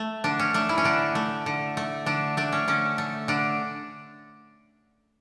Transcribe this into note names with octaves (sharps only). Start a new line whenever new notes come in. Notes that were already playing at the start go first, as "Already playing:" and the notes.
Already playing: A3
D3 D4
C#4
A3 D4
E4
C#4
D3 D4
A3
D3
A3
D3 D4
A3 D4
C#4
D3 C#4
A3
D3 D4